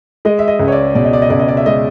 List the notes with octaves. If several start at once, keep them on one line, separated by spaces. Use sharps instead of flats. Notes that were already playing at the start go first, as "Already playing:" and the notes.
G#3 D#5
E5
D#5
C#2
C#5
D5
B2 D5
D#5
D5
D#5
C#2 D5
D#5
D5
E5
G#3 D#5